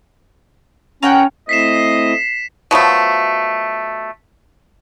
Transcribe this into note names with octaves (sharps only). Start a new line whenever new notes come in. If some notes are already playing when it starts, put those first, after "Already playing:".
C#4 A#4 F#5 G5
A3 C4 E4 D#5 B6 C7 E7
B2 F3 F#3 A3